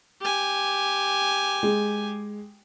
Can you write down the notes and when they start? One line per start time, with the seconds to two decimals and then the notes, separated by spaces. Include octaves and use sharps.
0.21 G4 G#5
1.63 G#3